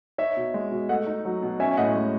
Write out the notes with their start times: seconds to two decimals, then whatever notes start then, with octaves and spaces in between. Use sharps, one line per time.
0.18 D#4 C#5 E5
0.37 B2
0.54 G#3
0.72 B2
0.89 A3 D#5 F#5
1.07 D#4
1.25 F#3
1.42 B2
1.60 C#4 E5 G#5
1.71 G#5
1.77 A2 D#5 F#5
1.96 G#3